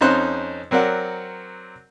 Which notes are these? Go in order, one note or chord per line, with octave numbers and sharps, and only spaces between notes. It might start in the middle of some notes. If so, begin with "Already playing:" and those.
F2 C#4 D#4 C5 F#6
F#3 C4 A#4 D5 F#5